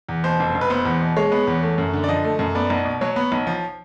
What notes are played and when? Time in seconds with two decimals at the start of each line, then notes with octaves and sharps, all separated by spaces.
0.09 E2
0.24 B2 C5
0.40 F1
0.55 F1
0.61 B4
0.70 B3 C5
0.85 E2
1.01 B2
1.17 G#3 C#5
1.32 B3
1.47 E2
1.62 A3
1.78 F#2
1.93 D3
2.04 D5
2.09 F3 D#5
2.24 A3
2.39 F#2
2.55 B3 D5
2.70 B1
2.85 B2
3.01 F#3 C#5
3.16 B3
3.32 B1
3.47 F3